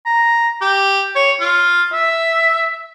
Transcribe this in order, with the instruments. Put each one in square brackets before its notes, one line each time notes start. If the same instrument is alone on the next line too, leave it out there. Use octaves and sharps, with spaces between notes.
[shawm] A#5
G4
C#5
F4
E5